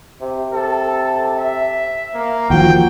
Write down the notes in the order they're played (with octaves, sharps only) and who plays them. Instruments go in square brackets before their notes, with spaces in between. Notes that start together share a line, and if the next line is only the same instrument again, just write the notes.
[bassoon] C3
[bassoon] C3 [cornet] A4
[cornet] E5
A#3
[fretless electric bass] D#2 F3 [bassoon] F#4 [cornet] G5